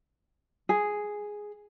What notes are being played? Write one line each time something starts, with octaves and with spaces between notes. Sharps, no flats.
G#4